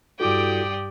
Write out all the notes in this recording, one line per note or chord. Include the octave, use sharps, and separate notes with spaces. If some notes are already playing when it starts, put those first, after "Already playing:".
G2 E4 F#4 G4 A4 D5 G5 D#6